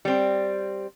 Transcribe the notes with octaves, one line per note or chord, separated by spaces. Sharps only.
G3 C4